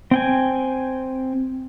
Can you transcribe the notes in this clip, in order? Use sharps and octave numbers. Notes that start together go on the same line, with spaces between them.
C4 G5 G#5